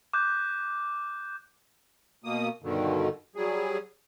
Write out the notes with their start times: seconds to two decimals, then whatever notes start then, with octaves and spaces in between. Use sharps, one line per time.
0.13 D6 F#6 G6
2.24 B2 A#3 D#6
2.63 G2 B2 D3 D#3
3.36 F#3 G3 G#4